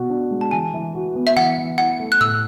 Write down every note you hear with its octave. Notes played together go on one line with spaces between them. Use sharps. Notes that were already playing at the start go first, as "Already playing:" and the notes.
Already playing: B2 F#4
D4
G#3
A5
E3 G#5
E3
F#4
B3
E5
E3 F#5
E3
E4 F#5
A3
F#6
A2 E6